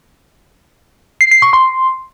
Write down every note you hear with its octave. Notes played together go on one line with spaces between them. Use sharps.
C7
C7
C#6
C6